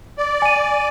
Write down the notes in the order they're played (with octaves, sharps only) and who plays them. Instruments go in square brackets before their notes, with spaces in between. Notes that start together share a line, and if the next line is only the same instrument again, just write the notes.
[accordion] D5
[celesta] G#5 D#7